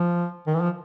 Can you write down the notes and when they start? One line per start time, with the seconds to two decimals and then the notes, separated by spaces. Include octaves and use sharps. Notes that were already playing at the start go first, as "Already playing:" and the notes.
Already playing: F3
0.47 D#3
0.54 E3
0.62 F3